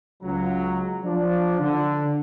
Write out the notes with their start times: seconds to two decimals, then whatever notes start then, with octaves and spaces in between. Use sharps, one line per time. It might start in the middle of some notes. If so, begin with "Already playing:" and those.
0.22 C#2 F#3 A#5
1.03 F3 D4
1.60 D3